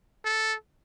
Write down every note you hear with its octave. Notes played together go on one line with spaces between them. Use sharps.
A4